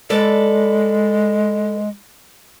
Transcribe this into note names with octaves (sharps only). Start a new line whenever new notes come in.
G#3 A4 B4 D5